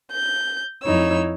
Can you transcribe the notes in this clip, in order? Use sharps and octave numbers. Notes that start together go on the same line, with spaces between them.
G6
F2 D#4 E4 C#5 E6